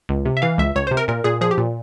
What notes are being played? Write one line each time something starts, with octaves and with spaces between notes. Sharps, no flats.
C#2
C3
E5
E3 F5
C#2 E5
C#2 C#5
C3 C5
A#4
A#2 A#4
A#2 G#4
F3 G#4
G4
A#2